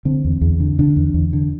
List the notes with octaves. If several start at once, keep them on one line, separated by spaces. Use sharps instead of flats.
D3 C4
E2
E2
D3
D3 D4
E2
E2
D3